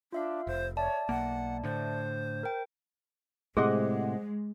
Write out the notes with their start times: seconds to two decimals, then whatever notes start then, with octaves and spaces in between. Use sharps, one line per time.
0.12 D4 F4 E5 F5
0.47 F1 C5
0.77 C#5 D5 E5 A5
1.09 B1 A#3 F#5
1.64 A2 D3 C5
2.43 A#4 G5
3.57 A2 C3 G#3 G#4 C5 D#5 F#5 D6